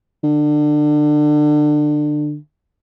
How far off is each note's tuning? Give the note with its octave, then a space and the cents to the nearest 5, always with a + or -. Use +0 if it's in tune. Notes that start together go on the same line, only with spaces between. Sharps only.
D3 +25